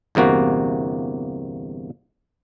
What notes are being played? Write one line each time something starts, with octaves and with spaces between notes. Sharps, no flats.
G1 E2 C3 A#3 F#4